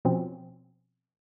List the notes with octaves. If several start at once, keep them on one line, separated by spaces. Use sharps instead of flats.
B2 F3 C4 C#4